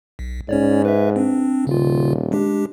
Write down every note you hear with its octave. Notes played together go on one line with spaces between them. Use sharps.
B1
G#2 C#4 C#5 D5
B4 E5
C4 D4
D#1 C#3 F4
G#3 D4 G4